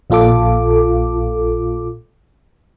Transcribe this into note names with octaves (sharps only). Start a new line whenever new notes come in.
A#1 A#2 F4 A4 D6